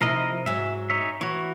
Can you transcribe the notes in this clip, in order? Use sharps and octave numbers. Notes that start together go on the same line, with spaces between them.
C3 F3 D#4 E4 A#4 D#5
G#2 F#3 E5
D#4 C#5 E5
E3 F#4 C#5